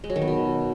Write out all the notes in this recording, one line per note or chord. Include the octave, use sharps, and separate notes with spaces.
G#3
F#3
D#3
B3
B2